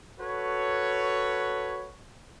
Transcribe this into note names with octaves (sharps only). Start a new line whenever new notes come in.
F#4 A4 B4 C#5